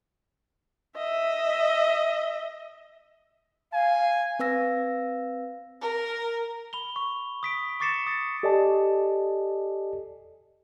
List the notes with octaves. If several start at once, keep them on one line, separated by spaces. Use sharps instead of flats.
D#5 E5
F5 G#5
C4 B4 F5 E6 A#6
A#4
B5 F7 G7
C#6
D#6 B6 D7
C#6 D6 A6 C7 C#7 E7
D#6 A6
G4 A4 D5 D#5 G#5 A5